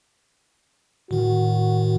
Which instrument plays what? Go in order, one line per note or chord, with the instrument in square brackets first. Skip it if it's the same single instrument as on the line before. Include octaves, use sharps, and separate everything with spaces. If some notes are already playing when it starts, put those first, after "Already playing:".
[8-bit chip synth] A2 D#3 [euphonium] F#4